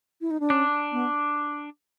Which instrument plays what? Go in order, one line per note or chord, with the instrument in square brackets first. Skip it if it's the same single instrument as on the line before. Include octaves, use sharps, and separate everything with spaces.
[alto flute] E4
D#4
D4
[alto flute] C#4 [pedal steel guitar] D4
[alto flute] B3